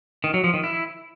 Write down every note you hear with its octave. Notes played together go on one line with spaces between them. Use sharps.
D#3
F#3
F3
D#3
E4